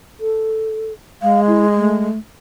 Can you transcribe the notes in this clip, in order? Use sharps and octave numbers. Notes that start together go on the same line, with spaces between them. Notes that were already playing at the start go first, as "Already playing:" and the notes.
A4
G#3 F5
E4
A3